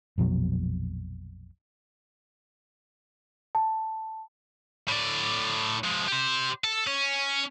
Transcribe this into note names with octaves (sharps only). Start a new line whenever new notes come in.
A#1 F2 B2 F#3
A5
A2 D5
F3 G#3
G4 C5
A4
C#4